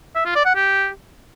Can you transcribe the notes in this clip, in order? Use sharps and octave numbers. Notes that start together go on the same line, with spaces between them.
E5
F4
D5
F#5
G4